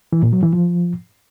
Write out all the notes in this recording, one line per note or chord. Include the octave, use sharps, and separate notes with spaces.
E3
A#2
F#3
E3
F3